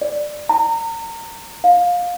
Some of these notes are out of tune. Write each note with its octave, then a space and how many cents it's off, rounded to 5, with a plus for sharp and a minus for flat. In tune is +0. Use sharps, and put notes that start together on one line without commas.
D5 +15
A#5 -30
F5 +20